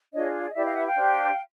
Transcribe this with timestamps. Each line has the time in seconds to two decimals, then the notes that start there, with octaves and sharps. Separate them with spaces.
0.13 D4 F4 G#4 C#5 D#5
0.40 D5
0.50 D#5
0.54 E4 G4 B4 D5 E5
0.65 D#5 F5
0.75 E5 F#5
0.85 F5 G5
0.96 D4 G4 C5